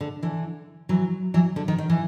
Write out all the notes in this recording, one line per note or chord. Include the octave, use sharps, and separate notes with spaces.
D3
D3 E3
E3 F#3
E3 F#3
D3
D#3
D#3
E3